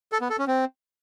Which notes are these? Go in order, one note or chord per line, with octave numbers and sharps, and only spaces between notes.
A4
B3
A4
C#4
C4